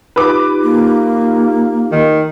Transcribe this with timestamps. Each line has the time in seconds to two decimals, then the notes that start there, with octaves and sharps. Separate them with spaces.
0.16 D#4 F4 G4 B4 D6
0.64 A#3
1.92 D#3